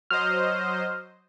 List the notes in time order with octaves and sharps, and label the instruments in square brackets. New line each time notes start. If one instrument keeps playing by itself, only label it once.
[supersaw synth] F#3 C5 D#5 [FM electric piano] F6